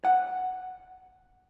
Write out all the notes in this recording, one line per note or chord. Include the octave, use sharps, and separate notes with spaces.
F#5